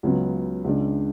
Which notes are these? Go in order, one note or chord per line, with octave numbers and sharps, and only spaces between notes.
C#2 C#3 F#3 B3
C#2 C#3 G#3 D4